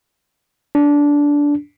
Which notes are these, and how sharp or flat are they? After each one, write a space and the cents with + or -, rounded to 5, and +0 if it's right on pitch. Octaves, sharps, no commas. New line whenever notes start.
D4 -15